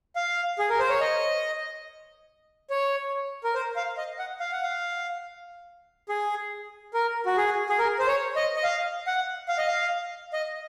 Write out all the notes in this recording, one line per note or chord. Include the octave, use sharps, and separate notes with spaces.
F5
G#4
A#4
C5
C#5
D#5
C#5
A#4
C5
F5
D#5
F#5
F5
F#5
F5
G#4
A#4
F#4
G#4
G#4
A#4
C5
C#5
D#5
D#5
F5
F#5
F5
D#5
F5
D#5